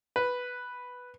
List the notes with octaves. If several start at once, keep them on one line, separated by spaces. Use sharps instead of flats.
B4